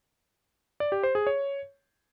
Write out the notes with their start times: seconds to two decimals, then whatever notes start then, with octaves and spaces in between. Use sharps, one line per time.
0.80 D5
0.92 G4
1.03 C5
1.15 G#4
1.27 C#5